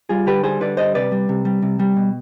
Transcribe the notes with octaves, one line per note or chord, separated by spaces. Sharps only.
G3 F4 G#4
D3 G4 B4
G3 G#4 C5
D3 B4 D5
G3 C5 D#5
C3 B4 D5
G3
C3
G3
C3
G3
B2